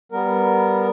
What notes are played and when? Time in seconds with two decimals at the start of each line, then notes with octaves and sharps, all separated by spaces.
0.12 G3 B3 A#4